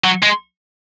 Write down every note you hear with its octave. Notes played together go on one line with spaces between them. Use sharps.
F#3
G#3